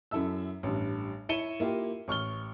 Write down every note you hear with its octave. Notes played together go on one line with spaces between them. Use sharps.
F#2 E4 A4 E5 E6
A1 G2
E4 C#5 C#7 D#7 E7 G7
A#3 E4 F4 G4
A1 C#6 F6 G7